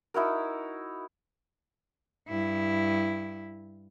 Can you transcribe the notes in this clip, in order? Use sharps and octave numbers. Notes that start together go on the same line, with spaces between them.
D#4 E4 F#4 A#4
G2 E4